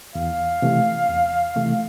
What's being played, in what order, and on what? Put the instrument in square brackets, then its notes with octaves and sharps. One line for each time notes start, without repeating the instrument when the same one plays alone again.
[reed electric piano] E2 [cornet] F5
[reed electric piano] C3 E3 A3
E2
C3 E3 A3